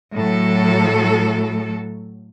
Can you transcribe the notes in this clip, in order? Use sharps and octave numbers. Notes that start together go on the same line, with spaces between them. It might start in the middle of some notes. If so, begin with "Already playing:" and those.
A2 F#3 A4